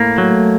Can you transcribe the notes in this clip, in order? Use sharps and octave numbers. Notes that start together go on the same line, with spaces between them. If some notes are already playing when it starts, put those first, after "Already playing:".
Already playing: A2 A#3
F#3 A3